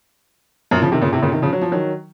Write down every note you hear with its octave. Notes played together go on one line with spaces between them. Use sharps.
F#2 A#2
C#3 F3
C3 D#3
A#2 C#3
A2 C3
A#2 C#3
C3 D#3
C#3 F3
F#3
F3
D#3 F#3